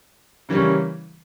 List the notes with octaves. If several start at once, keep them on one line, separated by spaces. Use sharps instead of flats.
C#3 E3 G3 A#3 C#4